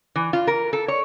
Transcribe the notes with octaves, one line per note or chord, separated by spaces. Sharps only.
E3
F4
A#4
A4
C#5